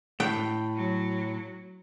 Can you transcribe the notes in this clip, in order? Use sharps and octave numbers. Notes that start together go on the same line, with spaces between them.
A2 G5
F#3